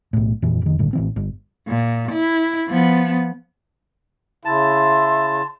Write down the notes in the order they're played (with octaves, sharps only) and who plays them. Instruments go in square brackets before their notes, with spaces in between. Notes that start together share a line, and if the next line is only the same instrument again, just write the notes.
[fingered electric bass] B1 A2
F#1 F2 A#2 E3
F1 D#3
A1 G2 D3
A1 E3 C4
G1
[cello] A#2
E4
F3 B3
[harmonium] C#3 E4 [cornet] E5 [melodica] A5 [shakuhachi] C6